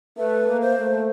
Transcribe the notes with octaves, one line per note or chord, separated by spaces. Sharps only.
A3 B4
A#3
C5
A3